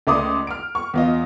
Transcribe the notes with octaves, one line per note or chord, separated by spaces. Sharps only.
C#2 A3 D5 C6 D6 D#6
F6 D7
C#6
E2 F4 D#5